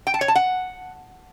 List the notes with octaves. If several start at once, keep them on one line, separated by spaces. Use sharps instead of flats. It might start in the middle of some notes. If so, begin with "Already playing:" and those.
G5
A5
C#5
A5
F#5